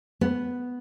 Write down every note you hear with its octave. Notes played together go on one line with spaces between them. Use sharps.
B3